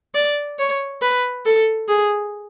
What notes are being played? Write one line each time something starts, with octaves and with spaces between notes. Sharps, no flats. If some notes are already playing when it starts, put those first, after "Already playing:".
D5
C#5
B4
A4
G#4